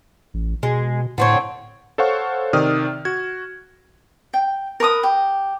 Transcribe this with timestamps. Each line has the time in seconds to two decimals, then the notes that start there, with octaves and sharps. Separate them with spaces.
0.34 A1
0.63 B2 G#3
1.18 A2 D3 C4 C#5
1.98 A4 C5 C#5 F5 F#5 C#6
2.53 C3 D#3 D5 D#6 F6
3.05 F#4 G#6
4.34 G5
4.80 A#4 B4 D6 D#6
5.03 G4